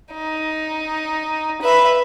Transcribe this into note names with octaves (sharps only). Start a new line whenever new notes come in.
D#4
B4 E5